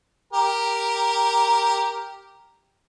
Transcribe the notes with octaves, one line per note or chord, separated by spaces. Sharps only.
G4 A#4